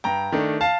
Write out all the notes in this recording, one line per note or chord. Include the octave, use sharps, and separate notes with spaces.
G2 G5 A#5
D#3 A3 D4
F5 A5